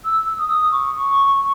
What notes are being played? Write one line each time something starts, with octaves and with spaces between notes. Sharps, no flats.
E6
D#6
C#6